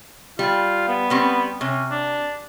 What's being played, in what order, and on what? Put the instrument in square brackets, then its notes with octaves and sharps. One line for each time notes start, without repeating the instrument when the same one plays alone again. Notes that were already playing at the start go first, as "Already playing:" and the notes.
[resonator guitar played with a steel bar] G3 [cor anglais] F4
[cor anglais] B3
[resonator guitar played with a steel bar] G3 C4 C#4
[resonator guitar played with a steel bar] C3 [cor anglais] C#4
[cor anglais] D4